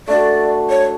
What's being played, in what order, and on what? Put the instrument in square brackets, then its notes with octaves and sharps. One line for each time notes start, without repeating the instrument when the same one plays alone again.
[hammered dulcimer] A3 D4 F#4 [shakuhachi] D5
[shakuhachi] C#5